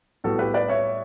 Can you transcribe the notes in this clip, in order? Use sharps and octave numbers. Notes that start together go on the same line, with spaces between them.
A2 G3 B3 F#4 A4
G4 B4
B4 D5
C#5 E5